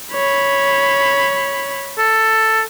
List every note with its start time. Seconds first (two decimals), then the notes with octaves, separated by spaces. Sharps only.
0.14 C#5 B5
1.98 A4